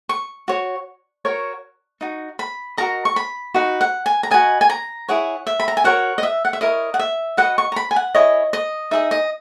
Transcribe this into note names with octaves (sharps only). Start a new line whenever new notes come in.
C#6
F#4 C#5
F#4 A#4 C#5
D#4 F#4
B5
F#4 A#4 D#5 A#5
C#6
B5
D#4 F#4 B4 A#5
F#5
G#5
A#5
F#4 B4 D#5 G#5
G#5
A#5
E4 G#4 C#5 F#5
E5
B5
A#5
G#5
F#4 A#4 C#5 F#5
D#5
E5
F#5
E5
E4 A#4 C#5 D#5
F#5
E5
F#4 B4 D#5 F#5
C#6
A#5
B5
G#5
F#5
E4 G#4 C#5 D#5
D#5
D#4 G#4 D#5 E5
D#5